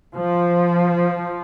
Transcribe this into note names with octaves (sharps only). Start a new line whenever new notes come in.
F3